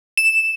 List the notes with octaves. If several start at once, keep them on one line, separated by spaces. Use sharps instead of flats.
E7